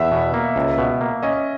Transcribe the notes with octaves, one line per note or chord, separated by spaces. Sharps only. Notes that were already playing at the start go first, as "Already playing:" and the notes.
Already playing: E2 E5 F#5
B2
A#3
C#2
B2
A#3
C#4 D#5